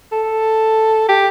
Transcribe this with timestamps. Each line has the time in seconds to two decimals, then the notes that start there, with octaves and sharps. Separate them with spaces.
0.12 A4
1.09 G4